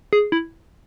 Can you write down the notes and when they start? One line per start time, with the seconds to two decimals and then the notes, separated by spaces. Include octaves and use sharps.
0.13 G#4
0.32 E4